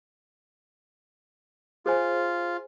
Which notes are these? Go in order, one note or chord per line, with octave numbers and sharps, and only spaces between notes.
F4 G#4 C5 G#5